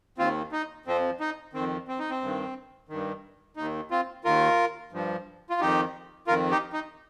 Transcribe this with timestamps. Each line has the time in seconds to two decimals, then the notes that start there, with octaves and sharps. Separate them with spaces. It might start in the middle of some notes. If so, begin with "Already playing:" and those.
0.18 D#2 D#3 C4 F4
0.52 D#4
0.86 F2 F3 C4
1.20 D#4
1.53 F2 D#3 C4
1.88 C4
1.99 D#4
2.10 C4
2.21 G2 D#3
2.89 G2 D#3
3.56 D#2 D#3 D#4
3.91 C4 F4
4.25 D#2 D#3 F4 A#4
4.92 G2 F3
5.50 F4
5.60 F2 D#3 D#4 G4
6.27 F2 D#3 F4 A#4
6.51 D#4 G4
6.73 D#4